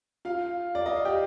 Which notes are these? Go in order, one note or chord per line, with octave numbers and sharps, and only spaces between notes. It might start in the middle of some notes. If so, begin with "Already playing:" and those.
F4 F5
D5
D#5
F5
G4 G5